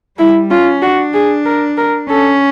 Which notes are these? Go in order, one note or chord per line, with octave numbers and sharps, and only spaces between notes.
G3 E4
C#4 F4
D4 F#4
G#4
A#4
A#4
C#4 A4